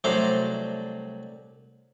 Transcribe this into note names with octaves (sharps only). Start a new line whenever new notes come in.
C2 F#3 A3 D4 C5 A#5